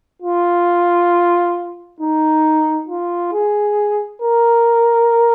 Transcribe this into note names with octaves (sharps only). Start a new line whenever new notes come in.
F4
D#4
F4
G#4
A#4